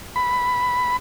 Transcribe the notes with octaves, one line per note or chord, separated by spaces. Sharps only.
B5